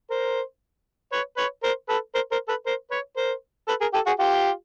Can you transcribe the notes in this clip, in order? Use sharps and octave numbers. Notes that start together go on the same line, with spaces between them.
A#4 C5
B4 C#5
B4 C#5
A#4 C5
A4 B4
A#4 C5
A#4 C5
A4 B4
A#4 C5
B4 C#5
A#4 C5
A4 B4
G#4 A#4
G4 A4
F#4 G#4
F4 G4